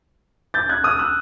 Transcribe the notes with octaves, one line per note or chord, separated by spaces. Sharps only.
G6 A6
F#6 G#6
D#6 F6
E6 F#6